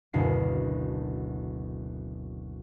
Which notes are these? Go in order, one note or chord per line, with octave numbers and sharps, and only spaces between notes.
F#1 D2 B2 C7